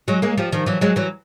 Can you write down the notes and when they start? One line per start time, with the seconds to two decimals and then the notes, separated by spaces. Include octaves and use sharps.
0.08 F#3 G#3
0.22 G#3 A#3
0.38 F3 G3
0.52 D#3 F3
0.66 E3 F#3
0.81 F#3 G#3
0.96 E3 F#3